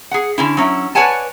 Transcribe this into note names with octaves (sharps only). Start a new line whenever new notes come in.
G#4 F#5
D3 C#4 E4
F#3 C#4 E4
B4 C#5 D5 F#5 G#5 A5